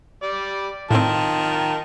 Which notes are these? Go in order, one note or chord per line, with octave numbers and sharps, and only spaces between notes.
G3 D5
A2 D#3 C4 F4 A5